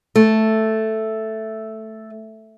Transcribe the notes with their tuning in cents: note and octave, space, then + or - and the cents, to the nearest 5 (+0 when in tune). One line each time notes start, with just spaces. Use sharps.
A3 +0